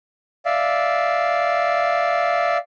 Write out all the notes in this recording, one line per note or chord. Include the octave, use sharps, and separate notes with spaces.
D5 E5 F5